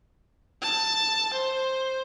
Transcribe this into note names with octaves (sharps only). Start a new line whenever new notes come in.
A5
C5